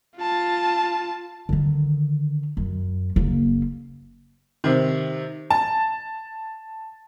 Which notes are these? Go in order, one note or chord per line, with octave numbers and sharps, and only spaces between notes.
F4 A5
D3 D#3
F#2
F#1 A#3
C3 D#3
A5